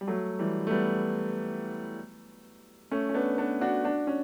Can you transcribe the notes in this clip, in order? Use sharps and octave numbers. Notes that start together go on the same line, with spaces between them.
G3
F#3 A3
E3 G3
A3
G3 B3
A3 C#4
C#4
B3 D4
B3 D4
D4 F#4
D4 F#4
C#4